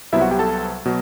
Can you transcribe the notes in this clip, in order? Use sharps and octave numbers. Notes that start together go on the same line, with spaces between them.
C2 C3 F#3 B3 E4 E5
F#4 F#5
G4 G5
A4 A5
B2 F#3